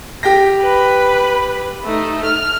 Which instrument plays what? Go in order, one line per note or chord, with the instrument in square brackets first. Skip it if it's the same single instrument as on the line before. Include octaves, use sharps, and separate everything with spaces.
[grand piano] G4 G5 A#6
[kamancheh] B4 B5
A3 D#4
F6